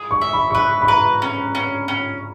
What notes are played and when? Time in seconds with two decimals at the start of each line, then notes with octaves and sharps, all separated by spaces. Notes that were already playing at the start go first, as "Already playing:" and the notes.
Already playing: G#4 D#6
0.11 C#6
0.21 E5
0.33 B5
0.51 C#6
0.54 B4 B5
0.82 B5
0.88 B4 A#5
1.22 C#4
1.55 C#4
1.88 C#4